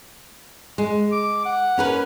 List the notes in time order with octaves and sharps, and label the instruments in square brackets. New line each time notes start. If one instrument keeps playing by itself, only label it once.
[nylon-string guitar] G#3
[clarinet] D6
F#5
[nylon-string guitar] C#4 A#4 B4